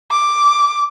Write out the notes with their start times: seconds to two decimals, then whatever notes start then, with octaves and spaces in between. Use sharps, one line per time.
0.11 D6